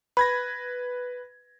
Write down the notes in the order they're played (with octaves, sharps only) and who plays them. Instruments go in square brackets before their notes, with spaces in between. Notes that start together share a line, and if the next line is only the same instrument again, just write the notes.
[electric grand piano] B4 G#6 A#6 [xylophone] B5